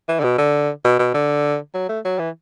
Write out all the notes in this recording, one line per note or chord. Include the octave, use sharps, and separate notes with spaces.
E3
D3
B2
D3
B2
B2
D3
F#3
A3
F#3
E3